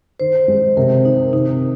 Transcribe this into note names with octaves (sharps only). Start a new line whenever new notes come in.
D#3 C5
G#3
C3 A#4
D#3 D#4
C3 D#4